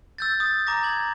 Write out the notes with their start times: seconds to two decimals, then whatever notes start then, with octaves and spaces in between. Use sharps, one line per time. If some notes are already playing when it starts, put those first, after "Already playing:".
0.18 E6 G6 A6
0.40 D#6 A6
0.67 A#5 D6 A#6
0.83 G#6 F#7